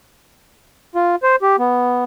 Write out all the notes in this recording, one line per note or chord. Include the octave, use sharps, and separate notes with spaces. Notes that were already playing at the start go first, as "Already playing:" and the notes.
F4
C5
G4
B3